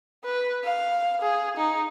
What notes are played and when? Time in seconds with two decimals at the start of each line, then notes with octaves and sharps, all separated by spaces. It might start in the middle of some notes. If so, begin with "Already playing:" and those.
0.25 B4
0.64 F5
1.21 G#4
1.57 D#4